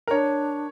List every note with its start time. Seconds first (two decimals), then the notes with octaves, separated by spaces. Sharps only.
0.07 A#4
0.11 D4 C#5